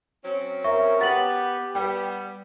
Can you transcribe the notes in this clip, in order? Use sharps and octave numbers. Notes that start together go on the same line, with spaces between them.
F#3 C4 C#4
A#4 E5 C#6
B3 G4 A6 F#7
G3 B3 G5